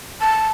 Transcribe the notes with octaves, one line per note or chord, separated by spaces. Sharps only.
A5